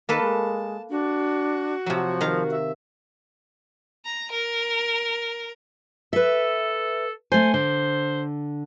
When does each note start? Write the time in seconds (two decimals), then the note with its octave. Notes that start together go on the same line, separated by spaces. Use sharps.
0.09 D#3 A#3 A4 B4 A5
0.22 G#3
0.90 D4 F#4
1.86 C3 F3 F#3
2.21 D#3 F5 A#5
2.51 E5
4.04 A#5
4.33 A#4
6.13 A4 B4 E5
7.32 A3 C5 G#5
7.54 D3 C5